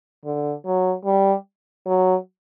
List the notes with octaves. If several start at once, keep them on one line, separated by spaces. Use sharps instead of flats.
D3
F#3
G3
F#3